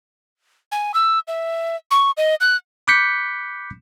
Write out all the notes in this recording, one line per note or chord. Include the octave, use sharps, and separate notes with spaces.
G#5
E6
E5
C#6
D#5
F#6
B5 D6 F#6 G6 B6 C#7